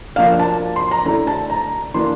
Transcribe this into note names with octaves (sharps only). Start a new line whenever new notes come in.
F3 A#3 D4 F5
A5
C6
A#5
D3 A3 E4 A#5
A5
A#5
E3 A#3 D4 C6